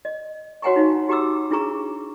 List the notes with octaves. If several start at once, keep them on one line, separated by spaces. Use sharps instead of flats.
D#5
F#4 C#5 F#5 G#5 A#5 C#6
D#4 F4 F5
F#4 G4 A#5 D6 E6
D4 E4 F4 G#4 A#5 C#6